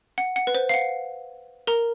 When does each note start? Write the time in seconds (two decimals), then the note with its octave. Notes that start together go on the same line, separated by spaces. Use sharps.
0.18 F#5
0.36 F#5
0.47 B4
0.55 C5
0.69 F5
0.74 F#5
1.67 A#4 A#5